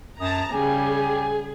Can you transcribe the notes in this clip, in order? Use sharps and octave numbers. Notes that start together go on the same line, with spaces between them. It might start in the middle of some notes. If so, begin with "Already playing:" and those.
F#2 A5 A#5 D#6
C#3 G3 G4 G#4 G#5